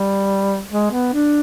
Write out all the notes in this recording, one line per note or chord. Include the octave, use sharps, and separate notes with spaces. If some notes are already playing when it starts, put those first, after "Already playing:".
Already playing: G3
G#3
B3
D4